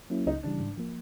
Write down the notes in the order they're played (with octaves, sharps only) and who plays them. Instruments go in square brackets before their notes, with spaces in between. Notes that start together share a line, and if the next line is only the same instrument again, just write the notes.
[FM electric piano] F#3 A#3 C#4 E4
[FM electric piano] C#2 [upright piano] D#4
[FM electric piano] C#3 E3 G3 [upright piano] D4
[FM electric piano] G#2
F3 A#3